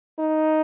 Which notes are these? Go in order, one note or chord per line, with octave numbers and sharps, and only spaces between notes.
D#4